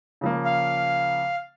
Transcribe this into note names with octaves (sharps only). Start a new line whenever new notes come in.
C#3 F3 A#3
F5